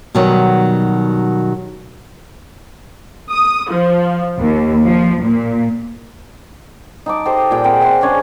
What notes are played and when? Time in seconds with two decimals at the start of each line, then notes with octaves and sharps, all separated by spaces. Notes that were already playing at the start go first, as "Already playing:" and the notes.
0.15 B2 D#3 F#3 G3
3.31 D#6
3.70 F3
4.39 D#2
4.83 F3
5.22 A#2
7.06 D#4 A5 D6
7.25 G4 A4 C5 D#5
7.51 A#2 G#4 D5 G5
7.64 C4 A#4 F#5 G5
7.81 E5 F#5 G#5 C6
8.01 C#3 C#4 D4 C#5